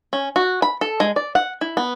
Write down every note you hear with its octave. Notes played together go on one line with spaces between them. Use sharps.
C#4
F#4
B5
A4
G#3
D5
F#5
E4
B3